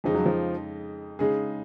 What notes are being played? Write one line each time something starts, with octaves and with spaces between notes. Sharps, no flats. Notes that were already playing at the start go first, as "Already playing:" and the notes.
F2 C#3 F3 G#3 D#4
F#3
F3
C#3 G#3 D#4 G#4